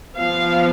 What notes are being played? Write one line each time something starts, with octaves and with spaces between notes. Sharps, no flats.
F3 B3 F5